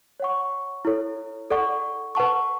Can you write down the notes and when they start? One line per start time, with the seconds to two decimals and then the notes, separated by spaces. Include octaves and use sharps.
0.20 C#5 F#5 C#6
0.85 E4 A4 C#5
1.51 A4 D5 F#5 C#6
2.15 B4 F#5 A5 C#6